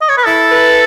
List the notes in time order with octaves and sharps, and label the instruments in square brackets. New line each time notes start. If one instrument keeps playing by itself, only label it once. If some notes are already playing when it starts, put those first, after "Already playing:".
[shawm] D#5
C#5
B4
[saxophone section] E4 [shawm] A4
[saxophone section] B4